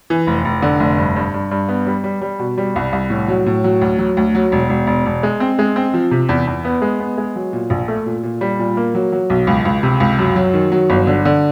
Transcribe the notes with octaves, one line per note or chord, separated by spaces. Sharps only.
E3
F1
F1
D3
F1
G2
G2
G2
G2
B3
G3
G3
G3
B2
G3
C2
C2
A2
F#3
A2
F#3
D2
F#3
D2
F#3
E1
E1
E1
E1
G#3
C4
G#3
C4
F3
C3
E2
E2
B3
G#3
B3
G#3
F#3
A#2
A#1
A3
A#2
A#2
G3
A#2
A#3
F#3
F#3
B1
C#2
C#2
C3
C#2
F#2
F#3
D#3
F#3
G1
D3
D3